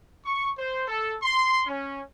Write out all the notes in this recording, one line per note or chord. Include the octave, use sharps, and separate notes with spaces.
C#6
C5
A4
C6
C#4